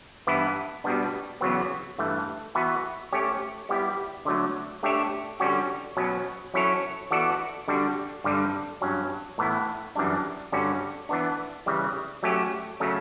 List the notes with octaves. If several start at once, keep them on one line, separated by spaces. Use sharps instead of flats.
G2 E3 B3 E4
B2 G3 B3 D4
E2 C#3 F#3 B3
G2 E3 A3
E3 B3 F#4 B4 E5
A3 C#4 G4 C#5
G3 B3 E4 G4 D5
D3 F#3 A3
A3 D4 G4 C#5 E5
D3 G3 C#4 F#4
B2 F#3 C#4
F#3 C#4 E4 A4 C#5
E3 B3 F#4 A4 D5
D3 G3 D4 F#4
G2 D3 G3
G2 F#3 C#4
A2 E3 B3 E4
F#2 E3 G3 D4
G2 D3 G3 C#4 F#4
E3 B3 D4
C#3 E3 G3
F#3 A3 C#4 G4
C#3 F#3 A3 C#4